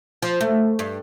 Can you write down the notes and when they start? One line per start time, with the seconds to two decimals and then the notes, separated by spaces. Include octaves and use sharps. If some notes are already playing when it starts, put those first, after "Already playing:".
0.22 F3
0.41 A3
0.79 G2